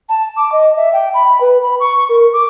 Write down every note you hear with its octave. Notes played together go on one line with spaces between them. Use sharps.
A5
D6
D#5
E5
G5
B5
B4
B5
C#6
A#4
D6